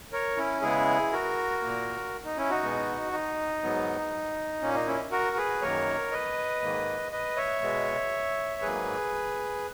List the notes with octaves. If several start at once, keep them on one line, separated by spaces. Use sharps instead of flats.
A#4 C#5
C#4 E4
C#3 G#3 B3 E4 G#4
F#4 A#4
A#2 A#3
D#4
C#4 E4
D#4 F#4
B2 G#3 B3
D#4
G#2 F#3 B3
A#2 A#3 C#4
D#4
C#4 E4
F#4 A#4
G#4 B4
F#2 D#3 F#3 A#3 A#4 C#5
B4 D#5
G#2 D#3 A#3
B4 D#5
C#5 E5
B2 G#3 B3
G#2 F#3 A#3 G#4 B4